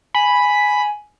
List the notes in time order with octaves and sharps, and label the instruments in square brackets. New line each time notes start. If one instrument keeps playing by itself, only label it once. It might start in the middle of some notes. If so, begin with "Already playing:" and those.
[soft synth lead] G#5 [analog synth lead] B5